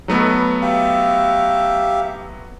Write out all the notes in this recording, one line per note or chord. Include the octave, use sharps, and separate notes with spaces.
F#3 A3 B3 D#4
B4
G4 E5 F5